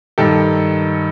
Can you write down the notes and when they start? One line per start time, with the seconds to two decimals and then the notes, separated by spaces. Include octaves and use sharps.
0.18 G2 D#3 G4 A4